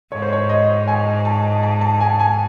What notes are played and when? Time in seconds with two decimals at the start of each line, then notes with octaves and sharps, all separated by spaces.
0.12 G#2 C#5
0.22 C5
0.33 C#5
0.49 D#5
0.88 G#5
1.25 A5
1.63 A5
1.81 A5
2.00 G#5
2.20 G#5